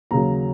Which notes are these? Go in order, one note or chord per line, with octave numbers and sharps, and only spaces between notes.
D#2 C#3 F#3 A#5